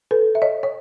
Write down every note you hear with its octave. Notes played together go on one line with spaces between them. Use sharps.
A4 B4
E5
C#5 D#5
C#5